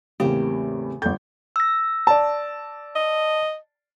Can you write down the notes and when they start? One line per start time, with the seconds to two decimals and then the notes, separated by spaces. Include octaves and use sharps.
0.20 E2 A2 C#3 A#3 C4 G4
1.02 G1 F2 G6
1.56 E6 A#6
2.07 D5 A5
2.96 D#5